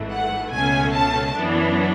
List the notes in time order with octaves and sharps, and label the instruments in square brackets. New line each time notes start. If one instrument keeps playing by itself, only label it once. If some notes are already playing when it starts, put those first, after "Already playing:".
Already playing: [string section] G#1 G#2 E3 A3
F#5
C#2 B2 A3 C#4 G#5
A5
F#2 E3 B3 D4